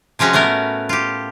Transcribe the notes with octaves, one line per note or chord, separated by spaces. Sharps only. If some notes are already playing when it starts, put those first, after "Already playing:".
C3 F3 G#3 C#4 F#4
A2 A3 B3 A#4
F4 G4